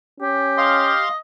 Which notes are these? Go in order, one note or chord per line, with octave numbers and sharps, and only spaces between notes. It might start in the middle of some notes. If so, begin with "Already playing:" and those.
C#4 G4
D#5 F5 C6